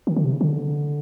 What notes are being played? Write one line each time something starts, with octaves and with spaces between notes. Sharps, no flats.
D#3
D3
C3
C#3
D3